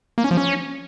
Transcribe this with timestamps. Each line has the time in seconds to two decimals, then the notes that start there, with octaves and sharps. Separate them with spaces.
0.18 A#3
0.24 C#4
0.31 F3
0.37 C#4